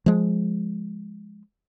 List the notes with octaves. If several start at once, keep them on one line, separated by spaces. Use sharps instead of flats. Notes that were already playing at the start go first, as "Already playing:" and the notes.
F3 G#3